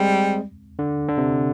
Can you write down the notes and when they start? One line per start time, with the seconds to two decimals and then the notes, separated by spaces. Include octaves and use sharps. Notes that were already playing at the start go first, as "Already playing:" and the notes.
Already playing: G3 G#3 C4
0.79 D3
1.09 D3
1.18 C3